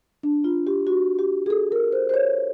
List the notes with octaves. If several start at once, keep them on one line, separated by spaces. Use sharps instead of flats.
D4
F4
G4
F#4
G4
G#4
A4
A#4
C5
C5
C#5